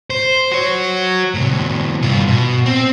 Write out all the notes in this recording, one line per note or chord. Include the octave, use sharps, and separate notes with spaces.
C5
F#4 C#5
A2 C3
G2 F4
B2
C4